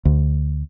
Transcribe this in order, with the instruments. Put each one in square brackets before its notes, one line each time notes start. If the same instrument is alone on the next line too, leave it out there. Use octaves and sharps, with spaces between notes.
[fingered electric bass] D2